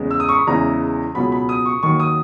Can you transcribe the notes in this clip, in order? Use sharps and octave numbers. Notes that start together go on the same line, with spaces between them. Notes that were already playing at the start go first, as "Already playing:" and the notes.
Already playing: E2 C#3 G#3
E6
D#6
C#6
B5
E2 C#3 E3 G#3 A#5
C#2 B2 F#3 B5
B5
D#6
C#6
D#2 D#3 F#3 C#6
D#6